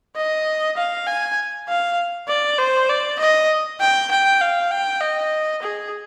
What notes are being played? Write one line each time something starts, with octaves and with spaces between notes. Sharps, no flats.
D#5
F5
G#5
F5
D5
C5
D5
D#5
G5
G5
F5
G5
D#5
G#4